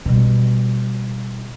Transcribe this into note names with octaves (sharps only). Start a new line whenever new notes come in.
B2 G3